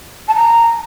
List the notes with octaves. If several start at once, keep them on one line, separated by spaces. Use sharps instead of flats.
A5
A#5